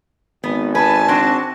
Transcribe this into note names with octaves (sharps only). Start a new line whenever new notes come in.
G#1 B3
B4 G#5 A5
C4 D4 F#4